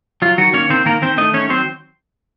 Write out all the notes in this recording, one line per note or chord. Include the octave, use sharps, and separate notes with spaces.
F#3 F4
D#3 F#3 F#4
A#3 C#4 C#5
D#3 C4 C5
D#3 A#3 A#4
D#3 C4 C5
A3 D#4 D#5
D#3 C#4 C#5
F#3 C4 C5